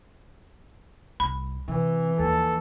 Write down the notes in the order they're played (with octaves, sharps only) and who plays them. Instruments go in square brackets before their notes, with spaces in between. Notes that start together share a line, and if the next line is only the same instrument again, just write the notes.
[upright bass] C2 [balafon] B5
[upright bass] C3 [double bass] E3
[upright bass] D#2 F3 [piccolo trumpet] A4